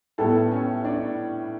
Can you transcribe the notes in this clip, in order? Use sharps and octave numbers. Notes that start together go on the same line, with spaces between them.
A2 G3 B3 A4 A5
C#4 C#5
D4 D5